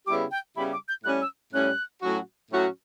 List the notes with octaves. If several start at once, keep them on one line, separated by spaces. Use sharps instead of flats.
C#3 G3 B3 E4 G4 D6
G5
C#3 G3 B3 E4 G4 B5
D6
G6
A2 G3 C#4 F#6
E6
A2 G3 C#4 F#6
A2 F#3 C#4 F#4
A2 F#3 C#4 F#4